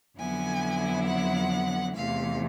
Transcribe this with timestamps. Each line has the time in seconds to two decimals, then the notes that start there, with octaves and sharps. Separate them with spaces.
0.18 F2 D3 F#3 B3 E4 G#5
1.07 F#5
1.95 E2 C3 E3 A3 F5